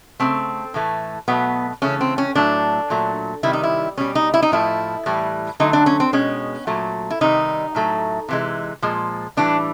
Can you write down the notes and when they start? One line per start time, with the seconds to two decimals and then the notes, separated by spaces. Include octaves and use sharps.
0.20 C#3 F#3 A3 C4
0.74 A2 E3 A3
1.28 B2 F#3 A3 B3
1.82 C#3 E3 A3 C#4
2.01 C4
2.18 C#4
2.35 A2 F#3 A3 D4
2.90 A#2 F#3 A3
3.43 C3 D#3 G3 E4
3.53 D#4
3.64 E4
3.98 B2 G3 C#4
4.15 D#4
4.34 E4
4.42 D#4
4.52 A2 F3 A3 E4
5.06 A2 E3 G3
5.60 D3 F#3 A3 D#4
5.73 D4
5.86 C#4
6.00 C4
6.13 B2 G#3 C#4
6.67 A#2 F#3 A3
7.10 E4
7.21 C3 D#3 G3 D#4
7.75 A2 F#3 A3
8.29 C3 E3 G#3
8.82 A#2 F3 G#3
9.37 A2 E3 G3 D4